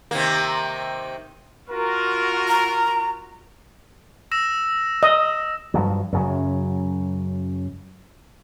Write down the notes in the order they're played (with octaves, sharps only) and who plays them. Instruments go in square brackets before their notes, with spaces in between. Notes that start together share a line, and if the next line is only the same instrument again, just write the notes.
[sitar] C3 D#3 A#3
[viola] F4 F#4 [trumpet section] A#4
[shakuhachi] A#5
[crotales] E6 A#6 E7
[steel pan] D#5
[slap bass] G2 F3 F#3
F#2 C#3 F#3